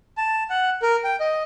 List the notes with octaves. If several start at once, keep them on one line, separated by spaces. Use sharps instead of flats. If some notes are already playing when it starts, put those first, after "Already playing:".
A5
F#5
A#4
G5
D#5